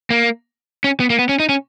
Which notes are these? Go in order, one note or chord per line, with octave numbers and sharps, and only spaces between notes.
A#3
C#4
B3
A#3
B3
C#4
D#4
C#4